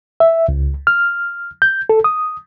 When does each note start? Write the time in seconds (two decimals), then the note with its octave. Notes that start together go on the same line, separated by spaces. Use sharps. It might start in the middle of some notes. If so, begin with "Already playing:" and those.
0.20 E5
0.48 C#2
0.87 F6
1.62 G6
1.89 A4
2.04 D#6